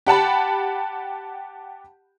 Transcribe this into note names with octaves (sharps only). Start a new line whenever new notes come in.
G4 F#5 A5 B5